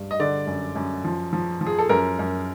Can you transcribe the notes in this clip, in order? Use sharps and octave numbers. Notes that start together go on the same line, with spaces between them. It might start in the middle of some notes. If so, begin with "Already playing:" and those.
Already playing: G2
D#5
D3 D5
F#2
F#2
F3
F3
F3
G#4
A4
F#2 A#4
F#2